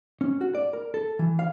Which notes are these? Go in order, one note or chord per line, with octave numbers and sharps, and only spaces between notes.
C#4
F#4
D5
A#4
A4
E3
F5